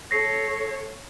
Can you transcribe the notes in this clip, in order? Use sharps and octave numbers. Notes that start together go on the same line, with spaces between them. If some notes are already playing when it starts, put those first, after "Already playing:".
A4 C#5 A#6 C7